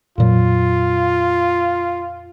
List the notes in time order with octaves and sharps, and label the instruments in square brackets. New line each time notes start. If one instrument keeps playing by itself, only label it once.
[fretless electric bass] F2 A#2 F#3 [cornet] F4